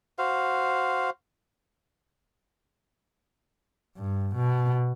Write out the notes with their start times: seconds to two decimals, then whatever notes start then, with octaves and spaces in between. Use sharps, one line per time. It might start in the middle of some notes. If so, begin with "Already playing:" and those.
0.18 F#4 C5 F5
3.97 G2
4.35 B2